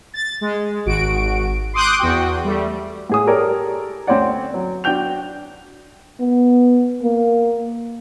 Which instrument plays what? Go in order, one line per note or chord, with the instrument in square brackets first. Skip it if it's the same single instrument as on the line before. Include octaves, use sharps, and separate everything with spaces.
[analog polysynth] A6
G#3
G#1 F#4 D7
C6 D6 D#6 F#6 G6 D7
E2 F#4 G5
G3 A3
[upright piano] A2 G#4 D#6
G4 A4 A#4 C#5 D5
D2 C4 C#4 C#5 D5 F#5
F#3
D4 F#4 G5 G6 F7
[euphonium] B3
A#3